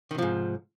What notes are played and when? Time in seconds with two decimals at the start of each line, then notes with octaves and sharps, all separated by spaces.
0.11 D#3
0.15 C3
0.18 F3
0.22 G#2